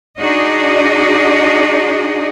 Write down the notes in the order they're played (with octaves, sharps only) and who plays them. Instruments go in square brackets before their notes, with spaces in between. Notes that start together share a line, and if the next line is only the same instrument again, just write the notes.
[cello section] D4 D#4 F#4 G#4 D5 D#5